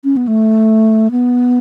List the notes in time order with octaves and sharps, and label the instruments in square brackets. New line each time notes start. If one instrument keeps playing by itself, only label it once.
[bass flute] C#4
B3
A3
B3